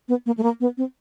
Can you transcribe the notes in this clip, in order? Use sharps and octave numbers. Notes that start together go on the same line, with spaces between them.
B3
A#3
A3
A#3
B3
C4